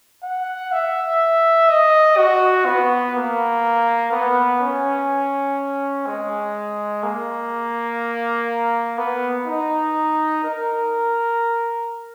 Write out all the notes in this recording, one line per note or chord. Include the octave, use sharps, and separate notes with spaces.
F#5
E5
D#5
F#4
B3
A#3
B3
C#4
G#3
A#3
B3
D#4
A#4